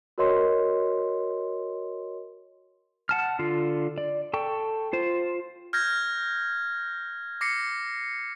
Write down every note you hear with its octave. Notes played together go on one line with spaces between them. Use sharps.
F#4 A#4 C#5 D#5 C6
F#5 A5 F6
D3 F4
D5
A4 G5 C#6
F4 C5
F6 G6 G#6 A#6
D6 A#6 C7 C#7